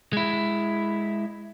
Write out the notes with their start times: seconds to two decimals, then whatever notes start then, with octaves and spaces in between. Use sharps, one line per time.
0.13 G#3 E4